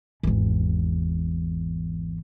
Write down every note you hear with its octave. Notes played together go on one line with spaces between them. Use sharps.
G#1 E2